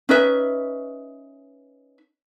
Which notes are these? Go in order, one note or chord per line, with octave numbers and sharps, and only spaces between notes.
C#4 D#4 B4 E5